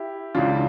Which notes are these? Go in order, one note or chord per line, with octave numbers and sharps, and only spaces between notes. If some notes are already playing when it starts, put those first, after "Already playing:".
Already playing: E4 G4
C#2 C#3 E3 D4 F4